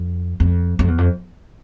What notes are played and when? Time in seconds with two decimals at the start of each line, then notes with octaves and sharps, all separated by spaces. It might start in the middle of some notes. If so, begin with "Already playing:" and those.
Already playing: F2
0.40 F2
0.79 F2
0.88 E2
0.98 F2